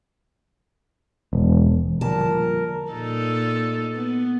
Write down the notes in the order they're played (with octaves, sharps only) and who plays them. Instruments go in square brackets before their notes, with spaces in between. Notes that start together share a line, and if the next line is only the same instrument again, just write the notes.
[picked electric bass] E1
[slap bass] A#2 [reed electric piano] D3 F3 G3 [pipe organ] A#4 [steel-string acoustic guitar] A5
[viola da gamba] A#2 D#4 A4
B3